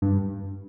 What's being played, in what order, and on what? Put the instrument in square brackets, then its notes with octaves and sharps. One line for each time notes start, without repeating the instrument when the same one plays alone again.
[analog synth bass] G2